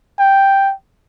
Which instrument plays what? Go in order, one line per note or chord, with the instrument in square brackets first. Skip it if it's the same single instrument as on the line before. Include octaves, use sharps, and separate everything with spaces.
[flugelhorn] G5